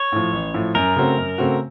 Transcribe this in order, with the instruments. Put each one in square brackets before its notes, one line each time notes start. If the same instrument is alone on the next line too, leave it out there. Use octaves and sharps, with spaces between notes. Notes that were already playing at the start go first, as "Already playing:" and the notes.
Already playing: [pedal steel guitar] C#5
[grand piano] A2 F3
A1
A2 F3
[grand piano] F#2 [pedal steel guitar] A#4
[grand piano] C#3 A3 C4 F#4
F#2
C#3 A3 C4 F#4